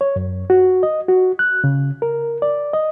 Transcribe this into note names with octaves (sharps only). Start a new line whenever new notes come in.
C#5
F#2
F#4
D#5
F#4
F#6
C#3
A#4
D5
D#5